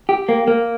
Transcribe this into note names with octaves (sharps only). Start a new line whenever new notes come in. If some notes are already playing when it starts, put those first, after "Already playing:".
G4
A#3
A#3